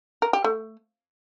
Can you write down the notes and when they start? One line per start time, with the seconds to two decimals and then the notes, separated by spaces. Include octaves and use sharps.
0.22 A#4
0.33 G4
0.44 A3